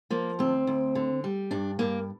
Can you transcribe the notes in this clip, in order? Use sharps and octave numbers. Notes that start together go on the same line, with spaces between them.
F3 A#3
D2 C4
D2
D3
G3
G2 D4
G2 A#3